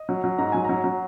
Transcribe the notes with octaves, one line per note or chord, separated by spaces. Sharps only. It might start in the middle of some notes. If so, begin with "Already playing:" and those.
Already playing: D#5
F#3
F#3
G#2 A#5
F#3 G#5
F#3 A#5
F#3